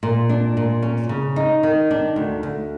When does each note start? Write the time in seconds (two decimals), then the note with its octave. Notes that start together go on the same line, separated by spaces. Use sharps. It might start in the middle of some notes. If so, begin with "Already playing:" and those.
0.03 A#2
0.29 D4
0.57 A#2
0.82 C#4
1.09 C#3
1.36 D#4
1.63 D#3
1.91 D4
2.16 D2
2.43 D2